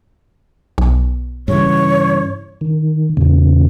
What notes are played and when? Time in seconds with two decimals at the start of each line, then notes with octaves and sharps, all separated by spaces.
0.78 B1
1.48 G2 C#3 E3 C#5
2.61 D#3
3.17 E2 A#2 C#3